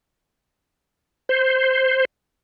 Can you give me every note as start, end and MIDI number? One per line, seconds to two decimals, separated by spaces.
1.29 2.05 72